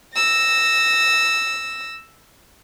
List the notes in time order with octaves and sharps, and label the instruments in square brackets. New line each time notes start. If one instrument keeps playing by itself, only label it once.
[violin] E6 A#6